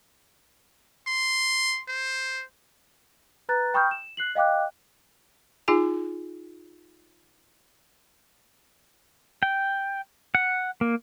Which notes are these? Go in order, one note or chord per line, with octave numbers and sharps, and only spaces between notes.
C6
C5
B4 A#5 F#6 A6
G5 B5 C#6 D#6 F6 G6
E7
F#6 C7 F#7
D#5 F5 G5 D6 F#6
D#4 F4 G#4 G#5
G5
F#5
A#3